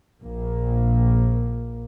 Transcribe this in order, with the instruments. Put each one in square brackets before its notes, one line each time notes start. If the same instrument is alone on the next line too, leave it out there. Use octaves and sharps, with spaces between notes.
[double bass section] A#1 A#3